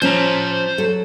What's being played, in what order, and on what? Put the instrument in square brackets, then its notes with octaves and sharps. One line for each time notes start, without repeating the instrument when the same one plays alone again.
[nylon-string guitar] F3 C#4 [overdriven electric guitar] C5 A#5
[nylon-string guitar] F#3 A4